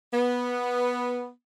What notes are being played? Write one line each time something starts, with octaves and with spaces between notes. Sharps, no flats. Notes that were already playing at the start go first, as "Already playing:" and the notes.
B3